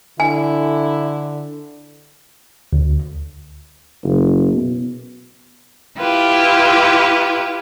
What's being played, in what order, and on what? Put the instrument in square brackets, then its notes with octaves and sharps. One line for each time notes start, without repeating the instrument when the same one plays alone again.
[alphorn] D3 [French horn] E4 [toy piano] G#5
[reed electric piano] D2
[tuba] F#1
B2
[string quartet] E4 F4 G4 B4